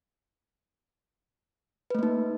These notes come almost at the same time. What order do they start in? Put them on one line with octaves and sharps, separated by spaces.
B4 A3 A#3 D#4